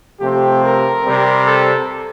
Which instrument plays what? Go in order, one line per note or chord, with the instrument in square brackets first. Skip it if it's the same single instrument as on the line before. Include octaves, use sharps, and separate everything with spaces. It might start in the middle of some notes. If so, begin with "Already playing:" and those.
[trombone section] C3 F3 A3 C4 G4
A#4
C3 G3 C4
A4